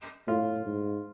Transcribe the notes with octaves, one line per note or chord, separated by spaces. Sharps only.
A2 F4
G#2